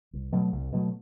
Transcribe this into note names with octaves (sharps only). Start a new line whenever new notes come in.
C2
B2 F#3 A3
C2
B2 F#3 A3